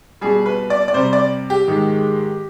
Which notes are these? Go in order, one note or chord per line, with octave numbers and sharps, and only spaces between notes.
B2 G3 G#4
B4
D5
D5
C3 G3 C5
D5
G4
G#2 D#3 G#3